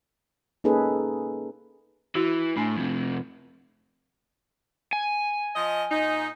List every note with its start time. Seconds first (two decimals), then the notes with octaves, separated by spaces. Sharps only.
0.64 A#3 C#4 D#4 G#4 A4 B4
2.15 E3 E4 F#4
2.57 A2 D4 G#5 C6
2.76 F2 C3
4.93 G#5
5.56 F3 D#5
5.90 A#2 D#4